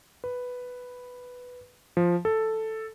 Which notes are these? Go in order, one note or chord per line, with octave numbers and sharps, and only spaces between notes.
B4
F3
A4